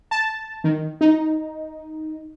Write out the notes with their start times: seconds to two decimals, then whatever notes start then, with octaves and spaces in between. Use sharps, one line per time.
0.11 A5
0.64 D#3
1.01 D#4